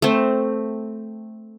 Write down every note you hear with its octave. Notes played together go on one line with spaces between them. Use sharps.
A3 C4